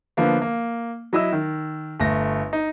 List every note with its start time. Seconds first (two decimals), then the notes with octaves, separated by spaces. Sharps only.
0.17 D3 F3 A#3 B3
0.42 A#3
1.13 F#3 E4 D#5 E5 E6
1.32 D#3
2.00 G1 A3 A#6
2.53 D#4